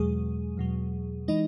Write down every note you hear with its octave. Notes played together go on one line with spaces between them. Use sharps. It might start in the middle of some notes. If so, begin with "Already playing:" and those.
Already playing: E2 B2 F#3 G#3 G#4
E2 B2 F#3
E3 G#3 D#4 D#5